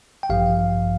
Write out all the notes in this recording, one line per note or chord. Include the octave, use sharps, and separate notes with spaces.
G5
A1 G2 F3 F5